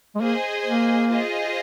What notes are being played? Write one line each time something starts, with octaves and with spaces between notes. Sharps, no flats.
G#3
A#3 G#4 C5 D#5 G#5
A#3
F4 G#4 C5 D#5